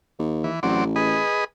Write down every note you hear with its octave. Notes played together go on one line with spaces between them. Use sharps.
D#2
E3
A1 F#3 C4 D5
G#4 B4 D#5